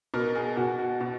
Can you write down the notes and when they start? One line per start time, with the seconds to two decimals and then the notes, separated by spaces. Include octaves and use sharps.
0.14 B2 A#4
0.36 G#4
0.57 B2 F#4
0.78 F#4
1.01 B2